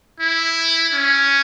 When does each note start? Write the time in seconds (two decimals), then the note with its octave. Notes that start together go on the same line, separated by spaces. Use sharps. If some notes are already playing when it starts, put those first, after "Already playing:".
0.20 E4
0.94 C#4